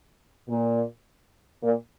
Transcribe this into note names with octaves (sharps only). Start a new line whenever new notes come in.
A#2
A#2